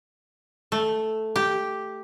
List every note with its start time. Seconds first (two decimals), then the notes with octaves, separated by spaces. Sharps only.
0.72 A3
1.36 G4